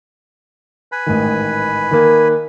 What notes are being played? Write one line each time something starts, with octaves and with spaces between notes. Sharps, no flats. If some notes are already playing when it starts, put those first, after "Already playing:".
B4 G#5 B5
A1 G#2 D#3
D#3 A#3